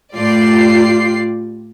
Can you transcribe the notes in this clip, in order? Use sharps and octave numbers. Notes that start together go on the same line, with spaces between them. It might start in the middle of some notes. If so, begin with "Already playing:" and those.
A2 F4 G4 D5 C7